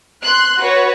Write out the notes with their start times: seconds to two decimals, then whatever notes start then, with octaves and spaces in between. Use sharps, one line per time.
0.22 C6 F#6
0.59 F#4 B4 C#5